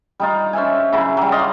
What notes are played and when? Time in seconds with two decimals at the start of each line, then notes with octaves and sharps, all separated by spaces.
0.20 G3 D#4 F4
0.53 C#4 C5 E5 G#5
0.93 C#3 F#3 E4
1.17 F#3 G3
1.32 D5 D#5 F5 C6